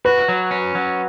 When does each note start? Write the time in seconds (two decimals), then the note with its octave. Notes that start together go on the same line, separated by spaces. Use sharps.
0.05 F#4 B4
0.28 F#3
0.51 C#4
0.75 F#3